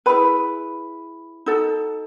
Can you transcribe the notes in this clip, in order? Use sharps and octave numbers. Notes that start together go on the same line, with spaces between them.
E4 G#4 B4 B5
D#4 F#4 A4